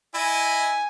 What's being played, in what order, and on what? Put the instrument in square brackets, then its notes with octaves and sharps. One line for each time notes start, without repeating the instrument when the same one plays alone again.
[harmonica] E4 D#5 [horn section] G#5